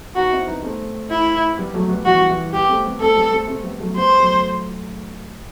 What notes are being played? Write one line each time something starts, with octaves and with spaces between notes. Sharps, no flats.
B3 D#4 F#4
C4 E4
B3 D#4
A3 C4
E4
G3 B3
F#3 A3
G3 B3
E3 G3 F#4
E3 G3
G3 B3 G4
A3 C4
G3 B3
A3 C4 A4
G3 B3
A3 C4
A3 C4
G3 B3
F#3 A3
G3 B3 C5
F#3 A3